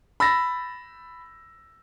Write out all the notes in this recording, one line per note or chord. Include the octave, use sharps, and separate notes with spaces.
B5 E6 A6 A#6